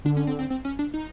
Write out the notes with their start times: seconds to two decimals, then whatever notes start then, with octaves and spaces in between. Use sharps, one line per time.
0.05 D3 D4
0.17 C#4
0.27 C4
0.39 C4
0.50 C4
0.65 C#4
0.79 D4
0.94 D#4